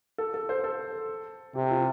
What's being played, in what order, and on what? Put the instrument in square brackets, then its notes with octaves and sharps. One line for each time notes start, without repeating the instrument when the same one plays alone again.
[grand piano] A4
A4
C5
A4
[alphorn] C3 [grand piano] G4
[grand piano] F4